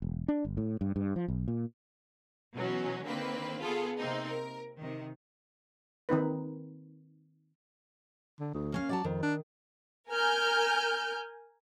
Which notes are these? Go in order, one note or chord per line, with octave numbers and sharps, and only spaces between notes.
E1
D4
G1
A2
G2
G2
F3
B1
A#2
B2 E3 F#3 C#4
D3 D#3 A#3 C4 B4
B3 F4 G#4 A4
C3 A#3 C4 D#4
A#4
C3 D#3
D#3 C4 D#4 B4
D3
D2
A#3 C#4 F5
F#3 D5 G5 A5
F2 D#3
D4
A#4 G#5 F6 G6